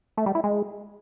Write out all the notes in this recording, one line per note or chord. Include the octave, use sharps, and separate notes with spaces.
A3
G3
E4
G#3